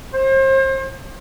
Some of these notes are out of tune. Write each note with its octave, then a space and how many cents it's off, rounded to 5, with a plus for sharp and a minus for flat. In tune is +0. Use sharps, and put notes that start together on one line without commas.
C5 +35